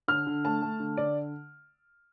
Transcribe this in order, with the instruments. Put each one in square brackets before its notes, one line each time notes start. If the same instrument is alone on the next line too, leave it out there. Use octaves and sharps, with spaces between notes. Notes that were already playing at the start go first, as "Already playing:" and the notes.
[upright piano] D3 F6
D3
A3 A5
A3
D3
D3 D5